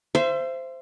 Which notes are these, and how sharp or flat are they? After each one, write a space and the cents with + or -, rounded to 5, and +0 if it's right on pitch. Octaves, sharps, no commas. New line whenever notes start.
C5 -5 E5 +35